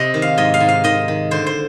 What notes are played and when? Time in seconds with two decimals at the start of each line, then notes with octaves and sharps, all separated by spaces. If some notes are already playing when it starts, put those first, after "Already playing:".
Already playing: C3 D#5
0.14 D#3
0.22 F5
0.38 G#2 D#5
0.54 F5
0.60 G#2
0.69 F5
0.84 D#3 D#5
1.08 D#3
1.31 D3 C5
1.47 C5